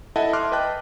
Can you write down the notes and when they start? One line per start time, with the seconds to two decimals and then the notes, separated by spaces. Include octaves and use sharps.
0.16 E4 A4 D#5 E5 F#5 A5
0.33 C6 D6 F6 F#6
0.52 B4 D#5 G5 A5 F#6